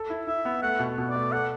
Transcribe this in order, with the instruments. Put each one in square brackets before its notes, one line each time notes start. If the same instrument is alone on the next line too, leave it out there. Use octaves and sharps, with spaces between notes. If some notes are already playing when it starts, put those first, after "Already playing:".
Already playing: [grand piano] A4
E4
[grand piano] E4 [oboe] E5
[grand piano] B3
[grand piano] A3 [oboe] F#5
[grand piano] B2
B2
[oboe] D5
[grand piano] A3
[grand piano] A4 [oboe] F#5